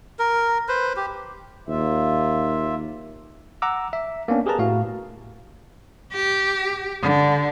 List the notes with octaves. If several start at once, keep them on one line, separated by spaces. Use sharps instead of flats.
A#4
B4 C5
G4
D#2 A#3 F4 E5
F#5 A#5 D6 E6
E5
A#3 B3 C#4 D4
G4 G#4 A#4 B4 A5 A#5
A2 A3 F#4 F5
G4
D3